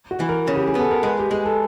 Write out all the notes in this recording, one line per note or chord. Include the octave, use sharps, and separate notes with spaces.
F#4
E3
A#4
C#3
G4
G#4
B3 A4
A#4
G#3 B4
G4
G#3 G#4
A4